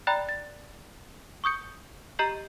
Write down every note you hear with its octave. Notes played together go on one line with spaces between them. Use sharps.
D5 G5 A#5 B5 F#6 A6
A6
C#6 D#6 G6 C#7
G4 D#5 A#5 G6 C7 F#7